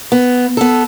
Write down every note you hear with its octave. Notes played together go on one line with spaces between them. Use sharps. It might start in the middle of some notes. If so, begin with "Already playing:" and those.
B3
B3 A4